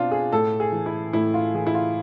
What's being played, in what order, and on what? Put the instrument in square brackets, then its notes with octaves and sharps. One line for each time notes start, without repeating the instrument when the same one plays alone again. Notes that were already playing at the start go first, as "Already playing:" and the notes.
Already playing: [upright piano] B2 C4 D4 F4
G#4
A2 A4
G#4
E3
E4
A2 E4
F4
E3 G#4
E4
F4